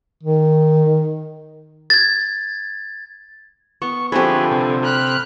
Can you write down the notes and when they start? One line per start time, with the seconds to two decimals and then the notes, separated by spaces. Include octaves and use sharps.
0.23 D#3
1.90 G#6 A6
3.82 B3 C#6
4.12 D3 F3 A3 C4 G4 G#4 B4
4.51 C3
4.84 B5 F6 F#6